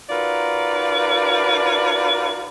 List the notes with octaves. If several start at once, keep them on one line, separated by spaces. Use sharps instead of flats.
D#4 F4 F#4 A#4 B4 D5